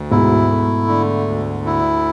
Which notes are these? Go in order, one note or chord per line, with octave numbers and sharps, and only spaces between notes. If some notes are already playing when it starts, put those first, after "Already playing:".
Already playing: D2
G#2 B2 E4
A3
D3
D2
E4